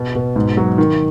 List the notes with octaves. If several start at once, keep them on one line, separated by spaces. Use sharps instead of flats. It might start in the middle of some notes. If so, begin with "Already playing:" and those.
Already playing: B2
B2
G#2
F#3
D#3